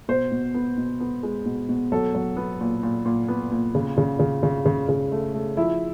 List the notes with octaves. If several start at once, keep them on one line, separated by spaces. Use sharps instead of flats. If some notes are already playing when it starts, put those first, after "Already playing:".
B2 C5
B2
B3
B2
B3
G#3
B2
B2
F#3 A4
F#3
B3
A#2
A#2
A#2
B3
A#2
C#3
C#3
C#3
C#3
C#3
C#3
A3
A3
F3 E4